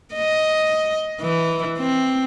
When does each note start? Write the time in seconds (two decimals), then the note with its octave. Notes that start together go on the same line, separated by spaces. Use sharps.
0.14 D#5
1.22 E3
1.78 C4